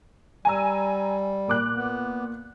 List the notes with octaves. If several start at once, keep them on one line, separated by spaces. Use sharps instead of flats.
G3 G#5 A#5 E6
A#2 D6 F#6
B3